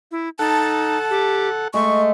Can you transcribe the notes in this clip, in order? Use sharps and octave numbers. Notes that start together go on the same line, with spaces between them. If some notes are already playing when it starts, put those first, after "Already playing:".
E4
D#4 A4 F#5 A5
G4
G#3 A3 C#6